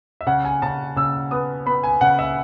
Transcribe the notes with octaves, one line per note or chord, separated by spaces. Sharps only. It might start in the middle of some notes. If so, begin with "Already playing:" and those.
E5
C#3 F#5
G#5
C#3 A5
C#3 E6
B3 D#6
B3 B5
G#5
C#3 F#5
E5